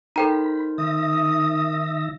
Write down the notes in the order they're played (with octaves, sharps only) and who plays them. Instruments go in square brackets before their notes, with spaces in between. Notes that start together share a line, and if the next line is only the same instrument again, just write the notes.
[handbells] D#4 A#4 C5 [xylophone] A4 G5 A#5 [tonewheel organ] B5
[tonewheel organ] D#3 E5 A#6 [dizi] D#6